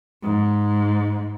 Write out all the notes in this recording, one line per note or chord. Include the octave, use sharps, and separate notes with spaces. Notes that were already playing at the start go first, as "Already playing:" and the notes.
G#2